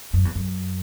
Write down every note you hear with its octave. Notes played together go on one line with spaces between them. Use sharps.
F#2
E2
F#2